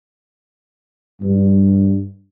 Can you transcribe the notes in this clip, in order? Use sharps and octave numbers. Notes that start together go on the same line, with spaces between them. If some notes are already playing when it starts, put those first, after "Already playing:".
G2